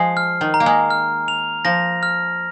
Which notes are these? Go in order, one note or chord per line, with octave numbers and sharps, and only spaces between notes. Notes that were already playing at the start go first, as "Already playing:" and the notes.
Already playing: F3 G#3 C7
F6
D#3
A#5
A#3
G#3
F6
F7
F3 A#6
F6